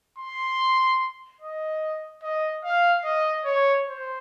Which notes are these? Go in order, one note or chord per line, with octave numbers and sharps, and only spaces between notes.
C6
D#5
D#5
F5
D#5
C#5
C5